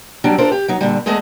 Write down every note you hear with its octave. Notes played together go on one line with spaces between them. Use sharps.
F#3 G3 C4 D4
D4 F4 A4 A#4 C5
G4
F#3 D#4
A#2 D3 G3
E2 G#3 A3 G#4 D#5